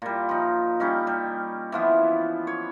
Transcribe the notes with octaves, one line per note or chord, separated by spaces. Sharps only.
A#2 G3
F3 D#4
G3 C#4 D#4
G3
E3 F3 B3
C#5